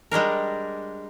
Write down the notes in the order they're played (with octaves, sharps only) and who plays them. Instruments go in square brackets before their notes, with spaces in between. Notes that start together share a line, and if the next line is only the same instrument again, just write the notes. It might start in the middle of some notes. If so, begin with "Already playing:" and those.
[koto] G3 G#3 D4 A#4